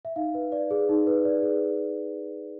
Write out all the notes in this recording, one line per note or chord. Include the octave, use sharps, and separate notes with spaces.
E5
D#4 F5
B4
D5
G#4
D#4
B4
D5
G#4